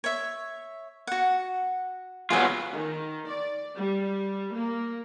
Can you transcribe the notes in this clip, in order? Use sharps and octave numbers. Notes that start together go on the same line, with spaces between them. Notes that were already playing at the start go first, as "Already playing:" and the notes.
C#5 E5
F#4 F#5
F#3 B3 F4 G#4 C5
D#3
D5
G3
A#3